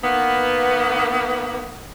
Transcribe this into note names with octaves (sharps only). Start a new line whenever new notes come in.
D#3 A#3 B3